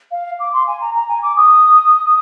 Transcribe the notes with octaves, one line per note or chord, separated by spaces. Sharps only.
F5
D6
C6
G#5
A#5
A#5
G#5
D6
D#6